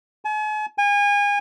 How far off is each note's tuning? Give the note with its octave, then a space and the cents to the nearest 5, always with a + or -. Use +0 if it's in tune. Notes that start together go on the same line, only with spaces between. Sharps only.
G#5 +45
G#5 -30